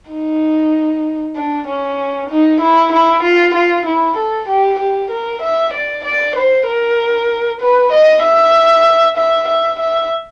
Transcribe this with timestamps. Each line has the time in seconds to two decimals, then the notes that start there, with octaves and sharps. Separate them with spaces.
0.11 D#4
1.36 D4
1.67 C#4
2.30 D#4
2.60 E4
2.92 E4
3.23 F4
3.54 F4
3.86 E4
4.17 A4
4.48 G4
4.79 G4
5.11 A#4
5.42 E5
5.73 D5
6.04 D5
6.35 C5
6.67 A#4
7.61 B4
7.92 D#5
8.23 E5
9.17 E5
9.48 E5
9.79 E5